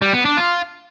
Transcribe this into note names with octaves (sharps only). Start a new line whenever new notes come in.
G3
B3
D4
F4